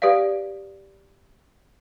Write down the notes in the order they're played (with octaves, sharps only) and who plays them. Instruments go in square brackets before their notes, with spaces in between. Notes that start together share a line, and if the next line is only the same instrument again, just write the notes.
[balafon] G4 B4 D5 F5